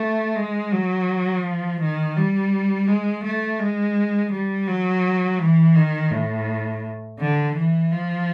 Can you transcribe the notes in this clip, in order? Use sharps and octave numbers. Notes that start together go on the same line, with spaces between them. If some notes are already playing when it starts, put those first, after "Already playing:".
Already playing: A3
G#3
F#3
F3
D#3
G3
G#3
A3
G#3
G3
F#3
E3
D#3
A2
D3
E3
F3